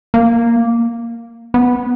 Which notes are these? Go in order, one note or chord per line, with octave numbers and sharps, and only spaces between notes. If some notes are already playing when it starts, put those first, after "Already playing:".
A#3
B3